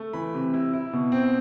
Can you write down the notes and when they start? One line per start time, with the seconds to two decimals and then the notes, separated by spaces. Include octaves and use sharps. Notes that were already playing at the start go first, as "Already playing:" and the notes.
Already playing: A3
0.13 E3 B5
0.34 C3
0.54 E4
0.74 E4
0.93 B2
1.12 C4